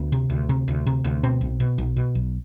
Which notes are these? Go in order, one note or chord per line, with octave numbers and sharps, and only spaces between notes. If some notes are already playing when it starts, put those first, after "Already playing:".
Already playing: D2 B3
C3
D2
C3
D2
C3
D2
B2 C4
B1
B2
B1
B2
B1